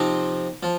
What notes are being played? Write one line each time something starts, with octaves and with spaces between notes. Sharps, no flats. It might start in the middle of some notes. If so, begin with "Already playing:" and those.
Already playing: C3 F3 C4 D#4
F3